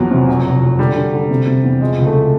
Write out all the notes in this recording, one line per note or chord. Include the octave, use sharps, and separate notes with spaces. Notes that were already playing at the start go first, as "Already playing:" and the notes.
Already playing: A#1 E2 F3 F#3
C3
F1
F1
F1
D3 G3
D3
D3
C3
C3
E2
F3 G#3
C#2
A3